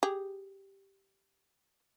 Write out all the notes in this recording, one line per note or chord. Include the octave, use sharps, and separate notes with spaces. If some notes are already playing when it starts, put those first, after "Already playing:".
G4 G#4